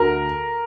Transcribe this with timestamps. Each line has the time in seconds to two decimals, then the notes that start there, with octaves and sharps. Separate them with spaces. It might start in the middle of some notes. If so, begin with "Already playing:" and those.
Already playing: D2 A#4